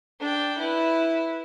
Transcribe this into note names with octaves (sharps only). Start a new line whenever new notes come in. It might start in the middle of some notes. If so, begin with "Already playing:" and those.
D4 G5
E4 B4